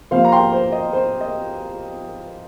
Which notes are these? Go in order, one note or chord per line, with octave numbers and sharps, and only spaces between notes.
C3 F3 A#3 C5 F5
A#5
G5 C6
C5
D#5
C5
D#5